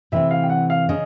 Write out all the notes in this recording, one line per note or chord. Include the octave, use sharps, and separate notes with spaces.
C3 E3 A3 C4 E5
F5
G5
F#5
F5
C#3 D#5